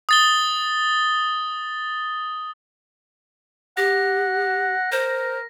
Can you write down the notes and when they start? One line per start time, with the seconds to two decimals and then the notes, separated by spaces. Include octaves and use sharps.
0.09 D#6 A6 G7
3.77 G4 F#5 A#6
4.92 A#4 C5